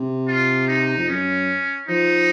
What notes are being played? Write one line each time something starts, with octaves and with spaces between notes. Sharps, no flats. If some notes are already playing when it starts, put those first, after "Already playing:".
Already playing: C3
F4
D#4
F2
F#2 C#4
F3 D#4